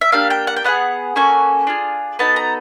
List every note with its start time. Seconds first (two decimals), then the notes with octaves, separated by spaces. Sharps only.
0.01 E5
0.12 A#3 D4 G4 F5
0.30 G5
0.47 F#5
0.56 G5
0.64 B3 D#4 G#4 F#5
1.16 A#3 C#4 F#4 A4 G#5
1.67 D4 F4 G#4
2.19 B3 D#4 F#4 A4 A5
2.36 A#5